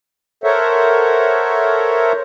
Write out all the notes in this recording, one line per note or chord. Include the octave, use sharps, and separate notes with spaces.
A4 A#4 C5 C#5 E5 F#5